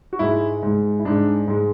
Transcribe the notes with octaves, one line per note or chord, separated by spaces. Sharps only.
F#4
G#2 G#3 E4
G#2 G#3
E4
G#2 G#3 D4
G#2 G#3